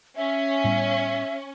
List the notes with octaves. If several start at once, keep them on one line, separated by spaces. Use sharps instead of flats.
C#4 E5
A2 G3 B3